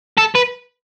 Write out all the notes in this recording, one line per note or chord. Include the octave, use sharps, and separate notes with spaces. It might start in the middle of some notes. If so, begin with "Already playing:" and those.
A4
B4